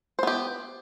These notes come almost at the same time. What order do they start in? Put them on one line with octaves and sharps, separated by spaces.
C5 B3 G4